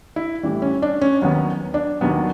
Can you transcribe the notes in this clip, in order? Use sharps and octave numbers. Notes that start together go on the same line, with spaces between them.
E4
A2 E3 G3
C#4
D4
C#4
D#2 D#3 F#3 B3
D4
D#2 D#3 F#3 B3